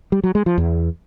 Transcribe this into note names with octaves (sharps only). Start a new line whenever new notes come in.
G3
F#3
G#3
F3
E2